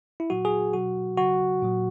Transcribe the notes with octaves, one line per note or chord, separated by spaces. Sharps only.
E4
A#2 F#3 F#4
G#4
B2 F#3 F#4
C#3 F#3 F#4
A#2 F#3